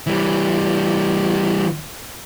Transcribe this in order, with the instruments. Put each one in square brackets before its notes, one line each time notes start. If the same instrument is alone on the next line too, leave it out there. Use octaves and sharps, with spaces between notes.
[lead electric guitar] E3 G3